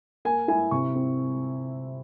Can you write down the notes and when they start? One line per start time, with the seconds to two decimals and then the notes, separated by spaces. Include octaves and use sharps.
0.25 A#3 G#5
0.48 E4 G#5
0.71 C3 C#6
0.95 C4